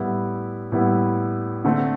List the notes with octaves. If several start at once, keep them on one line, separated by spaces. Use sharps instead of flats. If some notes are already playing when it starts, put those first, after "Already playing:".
Already playing: A2 G3 B3 E4
A2 G3 B3 E4
D3 A3 C4